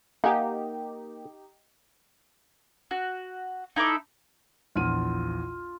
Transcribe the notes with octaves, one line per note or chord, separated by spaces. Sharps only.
A#3 D#4 G4 F#5 G#5
F#4
D#4 E4 A4 D6
A#1 E2 F4 D#7